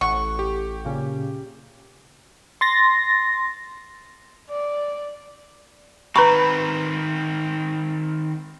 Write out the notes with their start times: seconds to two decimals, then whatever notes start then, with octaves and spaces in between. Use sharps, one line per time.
0.01 A1 F#5 C#6
0.39 G4
0.85 A#2 C#3
2.61 C6 A6 A#6
4.50 D5
6.16 D#3 C4 B4 A#5 B5 C#6